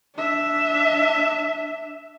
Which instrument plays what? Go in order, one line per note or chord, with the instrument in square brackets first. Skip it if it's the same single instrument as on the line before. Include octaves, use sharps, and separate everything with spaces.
[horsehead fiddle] D4 E5